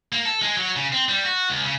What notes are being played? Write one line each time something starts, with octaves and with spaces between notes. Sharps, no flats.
A#3
A4
G#3
F#3
C#3
C4
G3
F#4
C#2
C#3